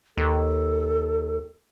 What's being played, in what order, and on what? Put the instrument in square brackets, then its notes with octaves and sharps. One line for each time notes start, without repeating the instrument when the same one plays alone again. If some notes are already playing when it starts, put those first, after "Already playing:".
[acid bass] D#2 [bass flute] A4